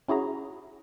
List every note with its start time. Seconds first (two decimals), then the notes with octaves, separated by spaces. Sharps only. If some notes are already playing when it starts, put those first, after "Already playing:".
0.08 C#4 E4 F#4 G#4 A#5